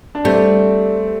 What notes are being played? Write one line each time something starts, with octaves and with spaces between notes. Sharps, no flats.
D4
G3 A3 C4